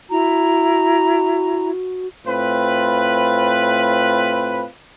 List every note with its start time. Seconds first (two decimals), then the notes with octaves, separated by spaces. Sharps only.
0.10 E4 F#4 A#5
2.26 A2 C4 F4 B4